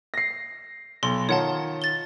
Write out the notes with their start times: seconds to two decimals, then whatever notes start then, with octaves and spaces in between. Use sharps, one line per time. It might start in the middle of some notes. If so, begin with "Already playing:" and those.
0.14 A#6 C7
1.03 B1 C6
1.29 D#3 F4 C#5 F#5 A5
1.82 A6 G7